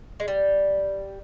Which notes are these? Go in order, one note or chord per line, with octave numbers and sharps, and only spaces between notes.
G#3
G3